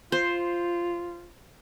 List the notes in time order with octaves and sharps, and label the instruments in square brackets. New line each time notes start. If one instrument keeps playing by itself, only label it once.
[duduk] F4 [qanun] C5